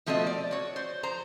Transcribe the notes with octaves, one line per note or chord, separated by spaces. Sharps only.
B2 F3 A3 C4 F#4 D#5
D5
F#4 C#5
C5
F3 C5 A#5